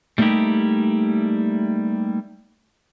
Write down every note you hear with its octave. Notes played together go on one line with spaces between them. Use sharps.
G3 A3 A#3 D#4 E4 G4